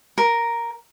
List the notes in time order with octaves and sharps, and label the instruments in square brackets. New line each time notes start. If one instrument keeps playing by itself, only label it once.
[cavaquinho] A#4